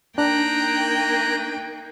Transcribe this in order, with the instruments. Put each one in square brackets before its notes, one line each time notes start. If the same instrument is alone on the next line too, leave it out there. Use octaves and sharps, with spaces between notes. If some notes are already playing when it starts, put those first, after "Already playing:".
[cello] A#3 D#4 [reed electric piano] D4 [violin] G5 [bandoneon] A#5 F#6